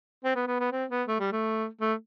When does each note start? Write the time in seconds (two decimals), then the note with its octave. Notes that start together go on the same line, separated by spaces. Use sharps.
0.24 C4
0.35 B3
0.47 B3
0.60 B3
0.72 C4
0.90 B3
1.08 A3
1.20 G3
1.32 A3
1.81 A3